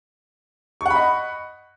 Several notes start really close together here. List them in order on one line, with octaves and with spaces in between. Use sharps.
C#6 F#5 B5 D#5